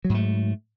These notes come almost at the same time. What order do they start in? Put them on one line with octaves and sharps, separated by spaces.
F#3 G#2 A3